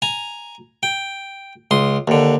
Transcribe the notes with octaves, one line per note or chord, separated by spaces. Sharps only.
G#5 A#5
G5
C#2 C6 D#6
D#2 D3